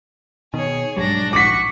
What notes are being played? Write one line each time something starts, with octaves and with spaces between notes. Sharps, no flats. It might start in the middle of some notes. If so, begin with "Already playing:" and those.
B2 D#3 G#4 C#5
B1 G#2 F#3 G3 D4 A#6
D#1 A#1 F#4 C#6 D6 B6